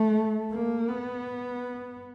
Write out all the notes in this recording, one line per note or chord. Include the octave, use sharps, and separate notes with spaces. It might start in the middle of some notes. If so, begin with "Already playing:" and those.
Already playing: A3
A#3
B3